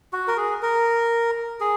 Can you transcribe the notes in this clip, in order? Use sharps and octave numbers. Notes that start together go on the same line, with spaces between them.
F#4
A#4
G#4
A#4
G#4